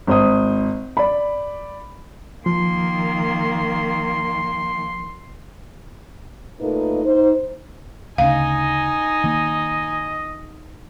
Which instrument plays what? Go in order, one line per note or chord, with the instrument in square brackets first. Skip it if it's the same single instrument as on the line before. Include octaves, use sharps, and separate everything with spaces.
[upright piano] G#1 C5 D#6
D5 B5
[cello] D#3 A#3 [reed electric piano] F3 [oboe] C6
[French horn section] A#2 A3 A#3 D#4 A#4 B4
D#4 C5
[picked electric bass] D2 C#3 [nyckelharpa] D#4 G#5 [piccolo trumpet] D#5 [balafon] F5
[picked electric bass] D#3 A#3